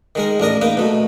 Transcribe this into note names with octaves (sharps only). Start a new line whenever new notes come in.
D#3 G#3 A#4
A1 D4 A#4 D#5
A#3 D#4 B4
B2 A3